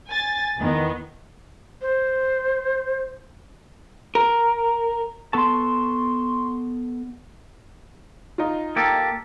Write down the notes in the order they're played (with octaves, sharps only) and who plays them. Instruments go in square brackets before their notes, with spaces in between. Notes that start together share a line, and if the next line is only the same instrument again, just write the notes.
[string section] G#5 A6
E2 D#3 B3
[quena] C5
[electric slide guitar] A#4
[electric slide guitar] B3 A4 A5 [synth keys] C6 C#6
[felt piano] D#4 F4
[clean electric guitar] A#3 G4 A4